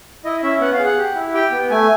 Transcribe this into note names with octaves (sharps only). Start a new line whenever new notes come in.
E4 D#5
C#4 E5
B3 F#5
F5
G#4
F#5
G4
E4
G4 G5
B3
A3 G#5